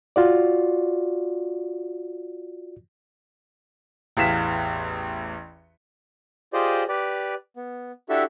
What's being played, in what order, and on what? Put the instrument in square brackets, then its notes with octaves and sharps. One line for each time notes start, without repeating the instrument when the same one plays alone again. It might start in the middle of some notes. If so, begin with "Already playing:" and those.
[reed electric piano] F4 F#4 D5
[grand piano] A1 E2 F5 B6 E7
[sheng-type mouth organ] F4 G4 G#4 C5 D5 D#5
G4 B4 D5
B3
D4 E4 F#4 G4 A4 E5